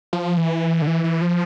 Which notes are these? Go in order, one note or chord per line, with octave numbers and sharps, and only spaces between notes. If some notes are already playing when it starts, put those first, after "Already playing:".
F3
E3
D3
E3
E3
F3